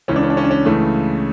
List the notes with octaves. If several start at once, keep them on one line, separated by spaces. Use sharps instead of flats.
C#2 C#3 E3 C#4
D4
C#4
D4
C#4
D4
C#4
C#2 C#3 E3 A3